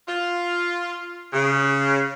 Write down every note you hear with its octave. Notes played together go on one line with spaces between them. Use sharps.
F4
C#3